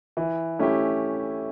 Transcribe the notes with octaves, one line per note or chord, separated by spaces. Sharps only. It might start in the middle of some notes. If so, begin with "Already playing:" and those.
E3
A3 C#4 E4 G4